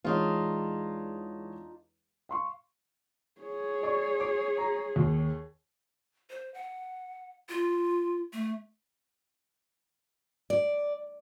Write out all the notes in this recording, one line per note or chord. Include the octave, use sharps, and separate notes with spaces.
E2 G#3 D4 D#4 F4 C#5
F5 C6 C#6
G#4 C#5
D5 C#6
D6
A#5
D#2
C5
F#5
F4
A3
D5